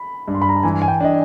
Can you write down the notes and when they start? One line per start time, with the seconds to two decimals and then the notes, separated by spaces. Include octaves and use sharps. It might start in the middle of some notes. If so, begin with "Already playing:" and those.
Already playing: B5
0.28 G2
0.34 C6
0.42 B5
0.49 A#5
0.56 A5
0.63 E3 G#5
0.82 G#5
0.88 G5
1.00 D4 D#5